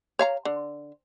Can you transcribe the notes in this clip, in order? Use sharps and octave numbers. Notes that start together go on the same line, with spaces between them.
C#5 F5 A#5
D3